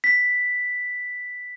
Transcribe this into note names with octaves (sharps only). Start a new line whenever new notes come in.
B6